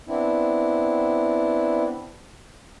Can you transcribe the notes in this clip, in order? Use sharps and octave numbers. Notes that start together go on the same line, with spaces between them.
B3 C4 D4 E4